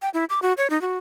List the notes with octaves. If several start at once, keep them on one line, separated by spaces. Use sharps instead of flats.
G5
E4
D6
F#4
C#5
D#4
F#4